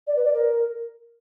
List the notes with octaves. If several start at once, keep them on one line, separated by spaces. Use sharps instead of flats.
D5
B4
D5
A#4